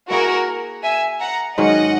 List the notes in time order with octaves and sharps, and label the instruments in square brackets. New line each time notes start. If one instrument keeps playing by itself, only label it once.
[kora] A#3 E4 G#4 [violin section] F#4 A#4
[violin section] E5 G#5
F#5 A#5
[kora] G#2 D#3 F#3 C#4 [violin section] D#5 F#5